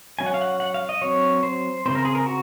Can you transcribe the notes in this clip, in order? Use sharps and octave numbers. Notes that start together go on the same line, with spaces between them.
F#3 C#4 G#5
F#5
F5
F#5
F#5
F5
D#5
F#3 C4 C#5
C5
C#3 F3 C4 C5
A#4
G#4
A#4
F#4